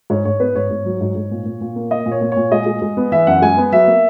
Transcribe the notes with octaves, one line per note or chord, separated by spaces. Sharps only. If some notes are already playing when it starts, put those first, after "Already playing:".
G#2 C#5
G#2 C#5
B3 B4
G#2 C#5
G#2
F#3
G#2
G#2
A#2
A#2
A#2
A#3
A#3 D#5
A#2
C#5
A#2
A#2 C#5
G#3 D#5
G#3
G#3
B3
E3 E5
F#2 F#5
G#3 G#5
B3
F#3 E5
A#3